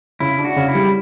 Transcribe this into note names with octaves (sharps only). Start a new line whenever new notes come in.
C#3 E4
D4
F#4
C#3
E4
G3